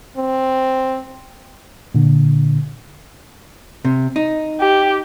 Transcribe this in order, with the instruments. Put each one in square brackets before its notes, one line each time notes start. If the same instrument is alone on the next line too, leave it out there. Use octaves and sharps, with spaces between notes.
[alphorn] C4
[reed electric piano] A#2 D3
[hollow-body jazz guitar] C3
D#4
[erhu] G4